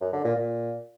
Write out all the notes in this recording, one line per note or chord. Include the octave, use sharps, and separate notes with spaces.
F#2
D3
A#2
A#2